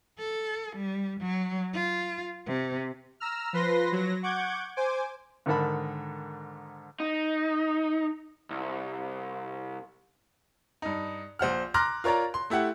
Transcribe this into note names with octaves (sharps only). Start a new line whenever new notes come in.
A4
G3
F#3
F4
C3
A#5 E6 F6
F3 B4 C6 A#6
F#3 A#6
F#5 C#6 D6 G6 G#6
C5 G#5 D6
G#2 D3 D#3 A#4 A5 B5
D#4
C2
G2 D#4
A#1 C5 F#5 F6
A#5 C6 D6 F6 F#6 A#6
F4 A#4 C#5 D5 A#5
C6
A3 E4 G4 F#5